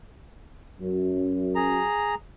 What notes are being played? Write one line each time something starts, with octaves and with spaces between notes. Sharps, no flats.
F#2
G#4 A#5